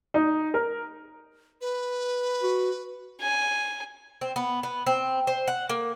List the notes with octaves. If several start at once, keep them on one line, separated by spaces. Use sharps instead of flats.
D#4
A#4
B4
F#4
G#5
C4
B3
B3
C4
C5
F#5
A#3